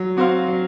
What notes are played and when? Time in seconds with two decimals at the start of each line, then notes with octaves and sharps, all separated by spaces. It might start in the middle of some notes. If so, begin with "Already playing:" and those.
Already playing: F#3
0.17 C4 F#4 C5 F5
0.48 F#3